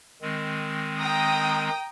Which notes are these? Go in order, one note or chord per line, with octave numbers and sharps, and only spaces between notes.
D#3 G#3 C4
G5 A#5 D#6